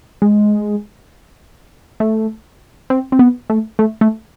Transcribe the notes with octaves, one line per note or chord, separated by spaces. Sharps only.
G#3
A3
C4
C4
B3
A3
A3
A3